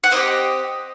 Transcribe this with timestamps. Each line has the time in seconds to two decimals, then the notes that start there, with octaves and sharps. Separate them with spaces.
0.04 F#5
0.11 C4 D#4 G4 D#5